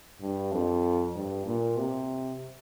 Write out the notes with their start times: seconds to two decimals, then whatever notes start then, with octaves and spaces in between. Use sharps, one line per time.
0.21 G2
0.52 F2
1.15 G2
1.46 A#2
1.77 C3